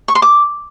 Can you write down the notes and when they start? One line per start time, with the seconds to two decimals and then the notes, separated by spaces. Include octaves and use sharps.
0.08 C#6
0.15 C6
0.22 D6